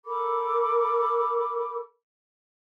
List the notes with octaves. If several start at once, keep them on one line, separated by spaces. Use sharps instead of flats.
A4 A#4 B5 D6